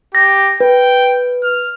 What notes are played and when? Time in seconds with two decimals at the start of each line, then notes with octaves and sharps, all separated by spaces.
0.15 G4 A#6
0.60 B4 G5
1.43 F6